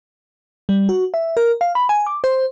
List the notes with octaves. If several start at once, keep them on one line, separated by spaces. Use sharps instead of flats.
G3
F#4
E5
A#4
F5
B5
G#5
D6
C5